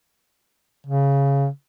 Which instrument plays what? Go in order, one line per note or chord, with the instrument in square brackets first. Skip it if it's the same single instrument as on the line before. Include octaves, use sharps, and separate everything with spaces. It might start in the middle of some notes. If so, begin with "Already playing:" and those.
[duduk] C#3